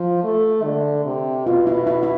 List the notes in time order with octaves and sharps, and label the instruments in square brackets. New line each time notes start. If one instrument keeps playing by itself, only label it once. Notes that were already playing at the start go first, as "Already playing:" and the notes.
Already playing: [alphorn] F3
A3
D3
C3
[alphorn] B2 [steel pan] F4
[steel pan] E4
E4
E4